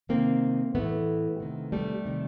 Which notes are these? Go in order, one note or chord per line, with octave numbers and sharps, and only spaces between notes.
C3 D#3 A#3 C4
A2 E3 A3 B3
C3 D#3
G3 A3
C3 D#3